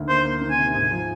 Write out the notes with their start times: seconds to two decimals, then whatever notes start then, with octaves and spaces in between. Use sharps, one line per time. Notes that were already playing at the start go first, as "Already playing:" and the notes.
Already playing: D2 D#3
0.09 A#3 C5
0.25 A#3
0.42 D#3
0.51 G#5
0.59 C3
0.75 G#2 G#5
0.91 F3